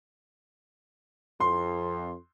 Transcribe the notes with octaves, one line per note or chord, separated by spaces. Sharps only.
F2 C6